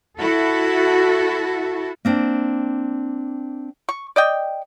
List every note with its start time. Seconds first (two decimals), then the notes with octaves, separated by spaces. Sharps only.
0.17 E4 F#4 A4
2.05 A#3 C4 D4
3.89 C#6
4.16 D5 D#5 G5